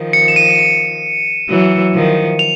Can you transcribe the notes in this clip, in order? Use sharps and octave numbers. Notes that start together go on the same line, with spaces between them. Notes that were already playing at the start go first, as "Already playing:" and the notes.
Already playing: D#3 F3
C#7
E7
D#7
D#7
E3 F#3
D#3 F3
F7